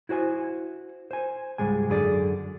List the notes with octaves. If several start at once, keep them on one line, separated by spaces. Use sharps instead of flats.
E4 F#4 C5 G#5
C5 G#5
C#2 G#2 G3 G#3 G#5
F#2 D3 G#4 D5